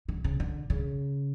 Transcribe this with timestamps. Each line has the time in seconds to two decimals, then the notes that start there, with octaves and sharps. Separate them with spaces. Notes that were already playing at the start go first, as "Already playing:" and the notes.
0.08 D3
0.24 C#3
0.40 D3
0.70 C#3